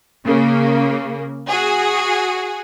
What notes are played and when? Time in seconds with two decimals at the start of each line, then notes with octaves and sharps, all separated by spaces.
0.25 C#3 A#3
1.49 F#4 G#4